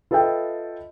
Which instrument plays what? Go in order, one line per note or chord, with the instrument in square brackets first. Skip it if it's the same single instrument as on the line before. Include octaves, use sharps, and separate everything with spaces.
[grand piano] F4 A4 B4 D#5 E5 G5